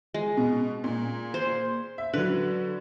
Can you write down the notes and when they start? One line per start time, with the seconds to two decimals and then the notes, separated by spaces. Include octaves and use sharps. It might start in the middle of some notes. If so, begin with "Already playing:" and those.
0.14 G#3
0.37 B2
0.84 A#2
1.34 C5
1.98 E5
2.14 D3 F#3 B4